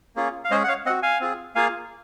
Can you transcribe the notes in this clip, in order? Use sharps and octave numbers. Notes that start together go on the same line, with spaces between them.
A#3 C#4 F4 G#4
F5
G#3 C#4 G#4 C5 D#5
F#5
C#5 F5
C4 F#4 D#5 F#5
F5 G#5
C4 F4 G#4
A#3 F4 G#4 F5 G#5